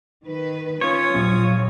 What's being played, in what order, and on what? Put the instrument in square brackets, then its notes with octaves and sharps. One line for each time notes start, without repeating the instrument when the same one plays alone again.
[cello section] D#3 B4
[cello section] C#4 [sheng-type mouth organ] F4 D#6 [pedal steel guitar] C#5
[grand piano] A#1 [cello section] F#3